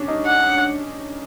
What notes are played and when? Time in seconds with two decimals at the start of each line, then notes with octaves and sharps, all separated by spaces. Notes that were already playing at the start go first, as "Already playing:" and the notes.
Already playing: C#4 D4
0.08 D#4
0.27 F#5